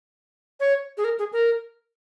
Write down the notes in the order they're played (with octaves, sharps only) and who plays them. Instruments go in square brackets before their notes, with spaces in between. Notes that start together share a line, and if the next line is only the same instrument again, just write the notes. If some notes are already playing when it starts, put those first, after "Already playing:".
[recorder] C#5
G#4
A#4
G#4
A#4